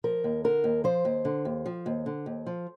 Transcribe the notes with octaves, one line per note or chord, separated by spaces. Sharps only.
F3 A#4
D#2
D3 A#4
D#2
F3 C5
D#2
D3
D#2
F3
D#2
D3
D#2
F3